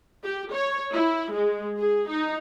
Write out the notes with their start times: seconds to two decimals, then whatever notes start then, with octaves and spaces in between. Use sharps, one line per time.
0.24 G4
0.53 C#5
0.93 E4
1.32 G#3
1.78 G#4
2.09 D#4